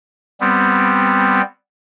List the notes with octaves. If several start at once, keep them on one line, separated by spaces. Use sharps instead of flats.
G3 B3 C4